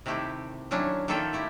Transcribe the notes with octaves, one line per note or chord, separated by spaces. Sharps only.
C3 D#3 A3 E4 G4
D#3 F#3 C#4 D4 E4
D#3 A#3 F4 A4 E5 G5
A3 E4 G4